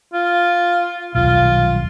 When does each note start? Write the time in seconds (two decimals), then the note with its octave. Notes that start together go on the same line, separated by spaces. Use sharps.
0.14 F4
1.15 D#1 B1 F4